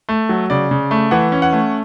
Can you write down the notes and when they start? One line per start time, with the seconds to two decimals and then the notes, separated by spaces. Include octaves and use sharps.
0.09 A3
0.29 F#3
0.50 C#3 D5
0.71 C#3
0.91 A3
1.11 E3 F#5
1.32 C#4
1.42 F#5
1.53 A3